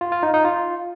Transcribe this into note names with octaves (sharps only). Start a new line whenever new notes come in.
F4
F4
D#4
D#4
F4